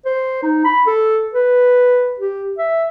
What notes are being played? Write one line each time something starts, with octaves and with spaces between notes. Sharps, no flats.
C5
D#4
B5
A4
B4
G4
E5